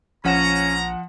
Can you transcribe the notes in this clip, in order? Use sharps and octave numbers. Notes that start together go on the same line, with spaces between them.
A#1 F3 C#4 F#5 A#5 E7